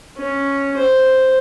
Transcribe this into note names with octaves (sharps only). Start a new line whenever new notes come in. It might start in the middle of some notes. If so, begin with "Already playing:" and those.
C#4
C5